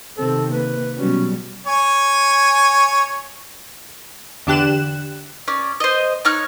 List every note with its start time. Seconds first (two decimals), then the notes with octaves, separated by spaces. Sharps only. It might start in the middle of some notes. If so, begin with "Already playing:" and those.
0.18 C3 D#3 C4 A4
0.51 A#3 B4
0.97 B2 F#3 G3 C#4
1.67 C#5 G#5
4.47 E2 D3 D4 G4 F#6 E7
5.48 C#4 D5
5.80 C5 D#5
6.25 D#4 C#5 F6 F#6